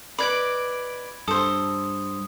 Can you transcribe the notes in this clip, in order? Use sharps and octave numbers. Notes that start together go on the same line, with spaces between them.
D#4 B4 D5 B5 G#6 D7
G2 A4 C5 D#6